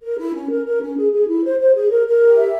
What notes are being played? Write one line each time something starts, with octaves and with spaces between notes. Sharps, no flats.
A#4
E4
C#4
A#4
A#4
C#4
G#4
G#4
E4
C5
C5
G#4
A#4
A#4
G4
E5